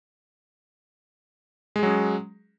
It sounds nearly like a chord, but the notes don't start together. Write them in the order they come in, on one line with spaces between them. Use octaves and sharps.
G#3 G#4 F#3 C#4